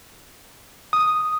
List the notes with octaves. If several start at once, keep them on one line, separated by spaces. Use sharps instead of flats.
D#6